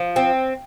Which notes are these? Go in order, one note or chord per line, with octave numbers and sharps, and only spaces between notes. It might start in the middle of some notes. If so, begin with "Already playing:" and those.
Already playing: F3
C4